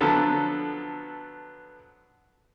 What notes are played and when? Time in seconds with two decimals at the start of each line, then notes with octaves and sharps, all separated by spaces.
0.01 D3 F3 F#3 B3 A4